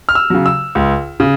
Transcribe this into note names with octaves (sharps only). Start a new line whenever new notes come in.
F6
E6
C#3 F#3
E6
C#2
C#3